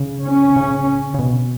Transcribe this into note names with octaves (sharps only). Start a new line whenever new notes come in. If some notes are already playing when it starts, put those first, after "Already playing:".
Already playing: C#3
C#4
C#3
C#3
B2